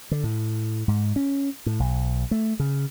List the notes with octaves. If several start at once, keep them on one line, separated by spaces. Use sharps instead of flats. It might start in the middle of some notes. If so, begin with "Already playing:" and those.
D3
A2
G#2
C#4
A2
B1
A3
C#3